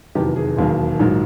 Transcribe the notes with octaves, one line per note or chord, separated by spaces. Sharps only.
F1 E2 C3 D#3 F#3 G4
G#4
E1 D#2 D#3 F#3
A#1 G#2 D#3 F#3